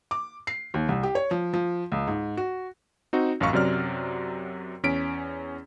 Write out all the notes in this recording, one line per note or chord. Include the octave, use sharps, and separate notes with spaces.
D6
C7
D#2
C2
G4
C#5
F3
F3
C#2
G#2
F#4
C4 D#4 F#4
A1 F#2 F5 C#6
F#2 C3 F#3 D5 F6
E2 C#4 B6 D7